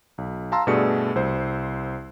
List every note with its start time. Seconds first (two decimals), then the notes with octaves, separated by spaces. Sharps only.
0.18 B1
0.52 F5 A5 A#5 C6 E6
0.67 G2 B2 A3 G#4 D5 C#7
1.16 C2 C5